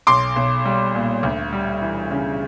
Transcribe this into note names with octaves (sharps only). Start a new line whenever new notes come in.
B1 C6 D6
B1
G3
A#2
D2
G3
E3
C#3